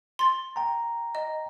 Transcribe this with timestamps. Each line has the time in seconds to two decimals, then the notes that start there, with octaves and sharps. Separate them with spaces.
0.19 C6 A6
0.56 G5 A#5
1.15 D#5